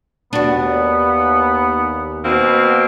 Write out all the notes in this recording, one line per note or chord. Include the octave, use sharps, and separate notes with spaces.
D#2 B3 D4 F#4
B2 A#3 C4 F#4